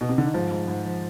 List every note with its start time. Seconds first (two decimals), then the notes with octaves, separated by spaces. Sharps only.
0.01 B2
0.09 C3
0.18 D3
0.25 D#3
0.34 G#2 F3
0.51 G#2
0.68 G#2
0.85 F3